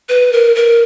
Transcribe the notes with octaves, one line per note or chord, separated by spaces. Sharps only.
B4
A#4
A#4